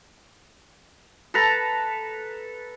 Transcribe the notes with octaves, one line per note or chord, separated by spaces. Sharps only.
A4 B4 A#5